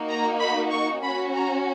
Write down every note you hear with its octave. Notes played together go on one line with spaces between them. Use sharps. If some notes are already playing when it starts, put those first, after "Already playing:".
Already playing: A#3 D#4 F#4
A#5
B5
C#6
C#4 F#4 B5
A#5